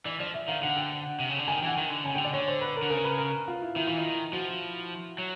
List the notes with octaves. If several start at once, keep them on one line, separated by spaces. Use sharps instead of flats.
E3 D5
F3 D5
E5
D#3 F5
D3 F#5
G5
C3
C#3
D3
D#3 G#5
G5
E3 F#5
D#3 G5
D3
C#3 G#5
D3 G5
D5
D3 C#5
C5
B4
A#4
D3
C#3 A#4
B4
A#4
F4
E4
D#3 E4
E3 F4
D#3 E4
F3 F#4
F#3